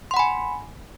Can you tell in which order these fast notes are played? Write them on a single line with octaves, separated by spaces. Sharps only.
C6 F#5 B5 G#5